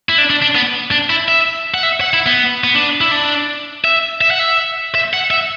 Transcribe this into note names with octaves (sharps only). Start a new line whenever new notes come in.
E4
D4
D4
D4
B3
D4
E4
E5
F#5
E5
F#5
E4
B3
B3
D4
E4
D4
E5
E5
F#5
E5
E5
F#5
E5